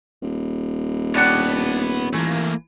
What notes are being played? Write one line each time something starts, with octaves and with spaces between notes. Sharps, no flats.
D#1
B3 D4 G4 C#5 F#5
E3 A3 A#3